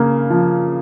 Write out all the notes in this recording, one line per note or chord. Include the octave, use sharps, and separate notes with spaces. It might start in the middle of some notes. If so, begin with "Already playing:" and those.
Already playing: C#3 A#3
F3